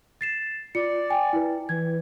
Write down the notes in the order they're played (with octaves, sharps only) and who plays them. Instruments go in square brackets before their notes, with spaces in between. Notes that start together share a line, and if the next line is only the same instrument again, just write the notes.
[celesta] A6 C7 E7
[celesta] F4 C#7 [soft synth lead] D5
[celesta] G5 G#5
E4 B4
[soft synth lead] E3 [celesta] G#6